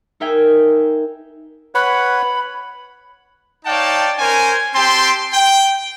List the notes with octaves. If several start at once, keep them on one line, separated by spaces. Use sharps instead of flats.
D#4 A#4 E5 G5 G#5
B4 C#5 F#5 B5
D#4 C#5 D5 F5 G5 A5
C#4 A#4 C5 G#5
C4 G4 G5 A5 C6
G5